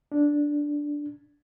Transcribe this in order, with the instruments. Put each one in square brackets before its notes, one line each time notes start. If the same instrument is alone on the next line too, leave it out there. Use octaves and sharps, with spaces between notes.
[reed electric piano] D4